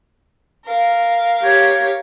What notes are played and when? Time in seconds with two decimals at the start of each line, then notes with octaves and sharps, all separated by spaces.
0.65 A#4 F5
1.42 G4 C#5